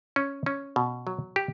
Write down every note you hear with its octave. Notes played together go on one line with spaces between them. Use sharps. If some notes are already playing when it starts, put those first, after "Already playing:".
C#4
C#4
B2
F#3
G4